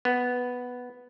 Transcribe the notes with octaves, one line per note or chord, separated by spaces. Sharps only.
B3